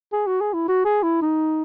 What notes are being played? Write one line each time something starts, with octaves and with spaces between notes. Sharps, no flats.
G#4
F#4
G#4
E4
F#4
G#4
E4
D#4